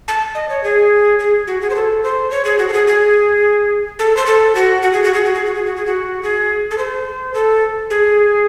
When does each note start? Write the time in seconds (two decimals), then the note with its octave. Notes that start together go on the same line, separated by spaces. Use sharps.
0.08 A5
0.35 D#5
0.49 C#5
0.64 G#4
1.19 G#4
1.47 F#4
1.61 G#4
1.70 C5
1.75 A4
2.04 C5
2.31 C#5
2.45 G#4
2.59 F#4
2.69 A4
2.73 G#4
2.87 G#4
3.99 A4
4.17 C5
4.26 A4
4.55 F#4
4.82 F#4
4.93 G#4
5.04 F#4
5.14 G#4
5.25 F#4
5.35 G#4
5.45 F#4
5.55 G#4
5.66 F#4
5.76 G#4
5.86 F#4
6.23 G#4
6.71 A4
6.78 C5
7.34 A4
7.90 G#4